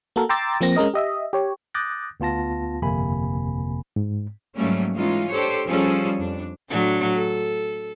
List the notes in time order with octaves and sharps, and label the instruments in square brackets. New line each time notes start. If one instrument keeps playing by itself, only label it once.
[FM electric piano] A#3 F#4 A4 A#4
G5 A#5 C6 D6 E6 A6
F3 A#3 C4 A#6
G#3 C#4 A#4 D#5
G4 D#5 E5
G4 C#5
[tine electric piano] D6 D#6 F#6 G6 A6 A#6
D2 B3 F4 A5 A#6
G1 F2 C3 A#3 G#5 B5
[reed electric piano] G#2
[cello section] G#2 F#3 G3 A3 A#3 C#4
E3 G#3 C#4 D#4 F4
D4 G4 A4 C5 C#5
F3 G3 C#4 G#4 A4
F2 D4
[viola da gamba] A2 F#3 D4
A4